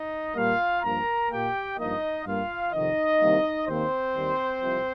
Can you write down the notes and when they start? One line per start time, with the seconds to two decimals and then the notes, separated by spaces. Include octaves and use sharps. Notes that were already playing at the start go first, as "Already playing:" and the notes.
Already playing: D#4 D#5
0.35 A#2 G3 A#3 F4 F5
0.82 G2 F3 A#3 A#4 A#5
1.29 A#2 A#3 G4 G5
1.77 G2 F3 A#3 D#4 D#5
2.24 G2 G3 A#3 F4 F5
2.71 F2 C3 D#3 D#4 D#5
3.20 C2 C3 D#3 G3 A#3
3.66 D#2 D#3 A#3 C4 C5
4.14 D#2 D#3 G3
4.61 C2 C3 F3